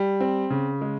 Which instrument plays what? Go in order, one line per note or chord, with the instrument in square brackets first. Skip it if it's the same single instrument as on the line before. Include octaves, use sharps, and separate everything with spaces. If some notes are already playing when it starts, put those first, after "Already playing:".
Already playing: [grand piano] G3
C4
C#3
G#3